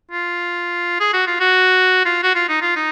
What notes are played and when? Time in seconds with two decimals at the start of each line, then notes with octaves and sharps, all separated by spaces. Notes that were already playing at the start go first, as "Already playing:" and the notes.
0.11 F4
1.00 G#4
1.14 F#4
1.27 F4
1.40 F#4
2.05 F4
2.23 F#4
2.35 F4
2.49 D#4
2.61 F4
2.76 D#4